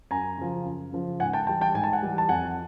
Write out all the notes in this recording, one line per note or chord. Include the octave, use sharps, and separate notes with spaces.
F#2 G#5 A#5
C#3 F3
F#2
C#3 F3
G#2 F#5 G#5
G5 A5
E3 G3 G5 A5
G5 A5
G#2 G#5
A5
F#5 G#5
E3 G3
A5
F2 F#5 G#5